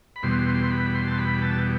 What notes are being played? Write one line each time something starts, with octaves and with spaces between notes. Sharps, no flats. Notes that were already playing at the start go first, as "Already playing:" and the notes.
B5
E2 B2 G3 C6
C6
C6
B5
C6
A5
B5
A5